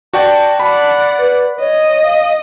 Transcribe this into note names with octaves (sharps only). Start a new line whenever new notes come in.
F#4 D5 G5 A5
D5 F#5 B5
B4
C#5 D#5
F5